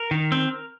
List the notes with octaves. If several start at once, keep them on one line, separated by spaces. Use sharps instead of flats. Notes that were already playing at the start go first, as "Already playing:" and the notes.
Already playing: A#4
D#3
C4